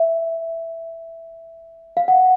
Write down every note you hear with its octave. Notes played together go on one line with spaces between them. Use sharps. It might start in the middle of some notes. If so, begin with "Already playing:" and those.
Already playing: E5
F5
F#5